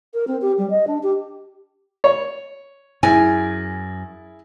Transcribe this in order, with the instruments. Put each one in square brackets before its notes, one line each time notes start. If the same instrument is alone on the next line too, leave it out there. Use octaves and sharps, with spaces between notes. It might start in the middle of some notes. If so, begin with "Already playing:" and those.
[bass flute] A#4
C4
G4
G3
D#5
D4
G4
[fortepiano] C#5
[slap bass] F#2 [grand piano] E4 G#4 [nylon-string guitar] G#5